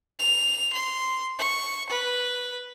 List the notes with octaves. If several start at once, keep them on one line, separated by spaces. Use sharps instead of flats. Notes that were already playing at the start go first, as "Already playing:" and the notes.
F7
C6
C#6
B4